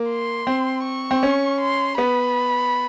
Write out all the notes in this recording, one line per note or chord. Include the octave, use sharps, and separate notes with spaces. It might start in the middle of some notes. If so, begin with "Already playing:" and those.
Already playing: A#3
C6
C4
C#6
C4
C#4
C6
B3 B5